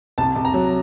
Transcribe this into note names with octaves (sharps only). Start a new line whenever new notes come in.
C2 A5
C2
A#5
F#3